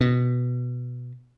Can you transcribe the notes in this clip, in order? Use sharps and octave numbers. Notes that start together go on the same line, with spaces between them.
B2